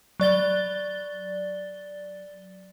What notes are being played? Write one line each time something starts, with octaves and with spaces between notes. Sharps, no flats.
F#3 D5 A6 G7